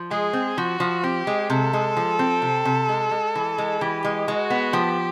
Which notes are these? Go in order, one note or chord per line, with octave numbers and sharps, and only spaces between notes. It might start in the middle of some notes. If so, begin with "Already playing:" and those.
Already playing: F3
G#3 G#4
C4
F3 F#4
F3
C4 G4
G#3
C3 A4
G#3
F3
C4
C3
C3
G#3
G#3
E3
G#3
E3 G4
G#3
G#3 F#4
B3
F3 G4